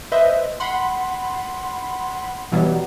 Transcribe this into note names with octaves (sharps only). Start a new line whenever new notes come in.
B4 C5 D#5 E5
F#5 B5 C6
B2 E3 F#3 G3 B3